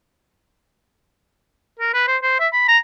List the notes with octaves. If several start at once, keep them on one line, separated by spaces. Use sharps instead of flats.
A#4
B4
C5
C5
E5
B5
A#5